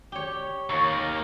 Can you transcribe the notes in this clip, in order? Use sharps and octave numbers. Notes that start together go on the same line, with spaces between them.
G4 C#5
D#2 C#6
A#4